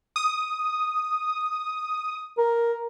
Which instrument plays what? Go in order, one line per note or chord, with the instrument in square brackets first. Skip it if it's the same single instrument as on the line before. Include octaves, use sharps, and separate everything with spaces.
[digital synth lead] D#6
[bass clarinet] A#4